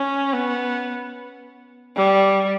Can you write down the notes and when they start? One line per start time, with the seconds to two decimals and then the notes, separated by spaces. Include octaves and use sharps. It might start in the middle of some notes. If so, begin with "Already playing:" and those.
Already playing: C#4
0.33 B3
1.97 G3